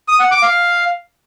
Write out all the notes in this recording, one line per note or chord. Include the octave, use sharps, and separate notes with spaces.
D#6
F#5
D6
F5